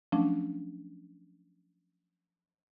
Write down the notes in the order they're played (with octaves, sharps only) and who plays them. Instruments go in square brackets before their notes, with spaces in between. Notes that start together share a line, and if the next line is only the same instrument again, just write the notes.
[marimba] F3 F#3 A3 C#4 D4